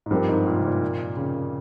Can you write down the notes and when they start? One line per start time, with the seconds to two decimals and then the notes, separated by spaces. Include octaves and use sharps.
0.06 G#2
0.11 G2 F3 C4 D#4 G4 A#4
0.29 G#2
0.46 A#2
0.57 C3
0.67 A#2
1.17 C#3